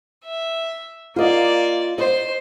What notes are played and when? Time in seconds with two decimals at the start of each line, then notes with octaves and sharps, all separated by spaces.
0.25 E5
1.16 A#3 F4 D5 D#5
1.98 C5 D#5